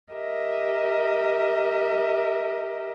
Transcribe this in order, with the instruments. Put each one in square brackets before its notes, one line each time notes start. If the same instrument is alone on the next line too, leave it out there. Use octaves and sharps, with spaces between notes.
[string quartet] G4 A#4 D#5 E5